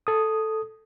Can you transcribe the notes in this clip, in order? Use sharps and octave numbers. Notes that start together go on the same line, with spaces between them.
A4 D#6